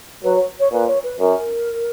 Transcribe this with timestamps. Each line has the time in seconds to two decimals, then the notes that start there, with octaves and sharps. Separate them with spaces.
0.24 F#3 B4
0.36 C#5
0.60 C#5
0.72 A#2 B4
0.88 C#5
1.04 B4
1.20 F#2 A#4